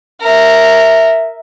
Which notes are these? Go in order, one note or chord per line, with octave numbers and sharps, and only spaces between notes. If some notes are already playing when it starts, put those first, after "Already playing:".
A#4 E5